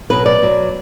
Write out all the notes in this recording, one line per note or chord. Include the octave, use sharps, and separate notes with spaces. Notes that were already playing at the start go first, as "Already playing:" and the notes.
B2 F#3 B4
D5
B2 F#3